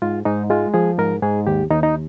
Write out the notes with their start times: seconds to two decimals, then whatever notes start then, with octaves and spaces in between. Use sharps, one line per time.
0.02 G#2 F4
0.25 G#2 D#4
0.50 G#3 F4
0.74 F3 G#4
0.98 G#2 A#4
1.23 G#2 G#4
1.47 D#2 G4
1.70 D#2 D#4
1.83 D#4